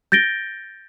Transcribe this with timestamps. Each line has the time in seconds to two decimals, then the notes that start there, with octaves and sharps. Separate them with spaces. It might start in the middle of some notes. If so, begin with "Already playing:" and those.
0.12 G6 A6 A#6 D7 G7